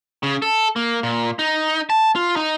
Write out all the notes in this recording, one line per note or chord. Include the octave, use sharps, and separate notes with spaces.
C#3
A4
A#3
A#2
D#4
A5
F4
D#4